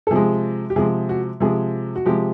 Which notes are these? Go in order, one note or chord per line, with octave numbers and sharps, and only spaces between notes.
A4
C3 F3 G#3 G#4
G4
C3 F3 G#3 G#4
F#4
C3 F3 G#3 G#4
F#4
C3 F3 G#3 G4